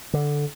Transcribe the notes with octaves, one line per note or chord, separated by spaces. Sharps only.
D3